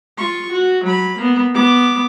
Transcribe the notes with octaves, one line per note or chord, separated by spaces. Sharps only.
F4 C#6
F#4
F#3 B5
A#3 B3
B3 D6